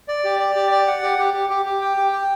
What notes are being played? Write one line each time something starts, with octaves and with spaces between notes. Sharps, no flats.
D5
G4
D5
G4
D5
F#5
G4
G4
G4
G4
G4
G5
G4
G5